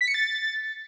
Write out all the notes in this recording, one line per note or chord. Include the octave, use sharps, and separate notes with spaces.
B6
C#7
A6